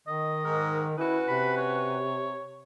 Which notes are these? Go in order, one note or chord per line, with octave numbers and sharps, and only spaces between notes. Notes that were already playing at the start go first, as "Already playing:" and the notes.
D#3 D#5
G#2 A#4
C#4 E4 F#4 B4
C3 B5
C#5